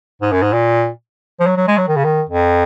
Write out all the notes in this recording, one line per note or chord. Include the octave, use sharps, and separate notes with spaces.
G#2
F#2
G#2
A#2
F3
F#3
F#3
G#3
F#3
D#3
C#3
D#3
F2